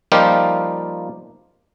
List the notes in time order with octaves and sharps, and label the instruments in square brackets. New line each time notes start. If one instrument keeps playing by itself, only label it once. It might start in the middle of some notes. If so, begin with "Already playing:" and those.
[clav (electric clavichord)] F3 G3 A#3 D#4 F4 G4